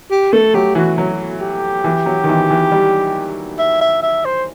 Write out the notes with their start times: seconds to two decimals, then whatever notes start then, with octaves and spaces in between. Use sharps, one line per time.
0.11 G4
0.33 A3 A4
0.54 F#3 G4
0.75 E3 F#4
0.98 F#3
1.41 G4
1.84 E3
2.06 F#3
2.24 D#3
2.29 E3
2.50 E3
2.72 G3
3.59 E5
3.81 E5
4.03 E5
4.25 C5